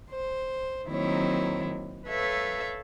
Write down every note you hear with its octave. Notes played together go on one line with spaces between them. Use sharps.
C5
D#3 F#3 A#3 C4 E4 C#5
A4 B4 C#5 E5 F5